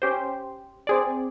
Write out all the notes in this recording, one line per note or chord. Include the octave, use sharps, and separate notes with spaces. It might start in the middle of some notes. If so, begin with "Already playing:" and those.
C#4 G4 C5
C4 G#4 D5